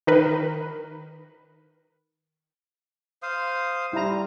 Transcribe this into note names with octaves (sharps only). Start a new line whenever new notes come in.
D#3 A#4 B4
C5 F5 D#6
G3 E4 A#5